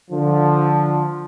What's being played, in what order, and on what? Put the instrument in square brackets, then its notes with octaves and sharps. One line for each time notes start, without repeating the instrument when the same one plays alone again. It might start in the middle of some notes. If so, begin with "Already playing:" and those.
[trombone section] D3 F3